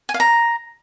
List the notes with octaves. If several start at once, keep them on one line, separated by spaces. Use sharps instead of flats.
G#5
F5
A#5